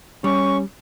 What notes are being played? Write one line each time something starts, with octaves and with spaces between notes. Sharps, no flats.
G3 C#4 C#6